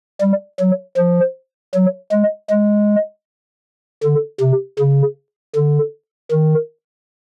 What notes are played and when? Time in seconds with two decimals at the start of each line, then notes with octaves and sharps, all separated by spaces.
0.21 G3
0.59 F#3
0.97 F3
1.74 F#3
2.12 G#3
2.50 G#3
4.03 D3
4.40 C3
4.79 C#3
5.55 D3
6.32 D#3